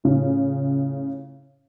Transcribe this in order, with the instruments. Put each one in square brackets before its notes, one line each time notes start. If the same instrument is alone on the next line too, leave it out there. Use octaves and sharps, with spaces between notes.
[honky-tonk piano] A2 C#3 F4